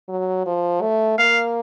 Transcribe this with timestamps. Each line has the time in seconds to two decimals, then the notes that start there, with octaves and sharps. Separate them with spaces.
0.09 F#3
0.46 F3
0.82 A3
1.19 A#3 F5